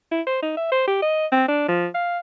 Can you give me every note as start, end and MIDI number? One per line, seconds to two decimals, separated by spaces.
0.12 0.21 64
0.27 0.39 72
0.43 0.53 63
0.57 0.70 76
0.72 0.85 72
0.87 0.97 67
1.02 1.26 75
1.32 1.46 60
1.48 1.67 62
1.68 1.87 53
1.94 2.19 77